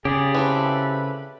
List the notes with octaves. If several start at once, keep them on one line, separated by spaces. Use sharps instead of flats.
C#3 G4 G#4 D5
E3 A3 C4 B4